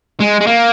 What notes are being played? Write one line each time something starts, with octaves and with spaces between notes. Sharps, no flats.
G#3
G#3
A#3